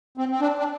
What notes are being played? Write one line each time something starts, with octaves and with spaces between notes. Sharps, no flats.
C4
C4
D4
D4